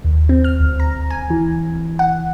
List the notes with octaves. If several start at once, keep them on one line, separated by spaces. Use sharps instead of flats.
D#2
C4
F6
D2
A#5
G#5
E3
F#5